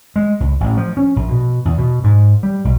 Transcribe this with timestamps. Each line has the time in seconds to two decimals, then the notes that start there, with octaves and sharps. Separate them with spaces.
0.16 G#3
0.40 C#2
0.60 A1
0.77 F3
0.97 C#4
1.16 A#1
1.29 B2
1.65 E2
1.78 B2
2.04 G#2
2.43 G3
2.65 B1